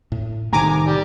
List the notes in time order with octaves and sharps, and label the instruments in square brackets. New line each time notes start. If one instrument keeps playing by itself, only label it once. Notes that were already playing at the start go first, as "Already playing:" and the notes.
[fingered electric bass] A2
[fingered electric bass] C2 C3 C4 [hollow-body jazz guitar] A2 D#3 [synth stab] G#5 A#5 D6
[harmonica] G3